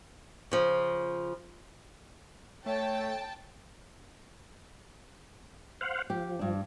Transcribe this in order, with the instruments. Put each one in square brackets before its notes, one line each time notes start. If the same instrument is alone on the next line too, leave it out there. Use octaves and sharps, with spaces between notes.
[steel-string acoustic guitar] C#3 F3
[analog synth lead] A3 [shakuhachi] C#5 [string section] G5 A5
[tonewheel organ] C5 F5 F#5
[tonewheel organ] F3 [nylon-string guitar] G4
[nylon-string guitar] G2 D4